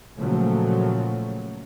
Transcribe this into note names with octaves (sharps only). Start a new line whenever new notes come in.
A#2 C#3 F3 F#3 A3